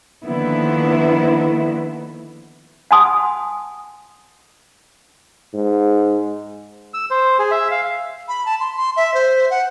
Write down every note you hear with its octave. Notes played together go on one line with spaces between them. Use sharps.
D3 D#3 F3 A#3 B3 E4
F#5 G#5 A5 C6 D#6
G#2
E6
C5
G#4
E5
F5
B5
A5
C6
C6
E5
C5
F#5